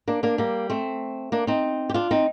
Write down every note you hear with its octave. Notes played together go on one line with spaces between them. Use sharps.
A#3 D4
A#3 D4
G3 A#3
A3 C4
A#3 D4
C4 D#4
G4
D4 F4
C4 D#4